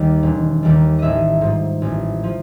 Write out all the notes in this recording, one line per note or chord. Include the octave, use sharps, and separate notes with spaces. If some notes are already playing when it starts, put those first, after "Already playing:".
Already playing: D#2 D#3 G3
E1
D#2 D#3 G3
A1 D#5 E5
G#2 F3
A1
F3